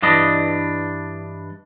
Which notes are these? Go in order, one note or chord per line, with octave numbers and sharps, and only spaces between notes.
G2 E3 D4 D#5